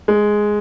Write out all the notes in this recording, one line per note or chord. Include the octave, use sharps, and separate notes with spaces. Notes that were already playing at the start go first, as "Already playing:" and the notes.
G#3